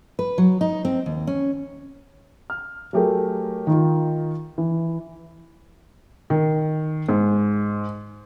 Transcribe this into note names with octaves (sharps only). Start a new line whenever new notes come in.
B4
F#3
D#4
C4
D#2
C#4
F6
F#3 A3 G4 G#4 A#4
D#3 D#4 F4
E3
D#3
G#2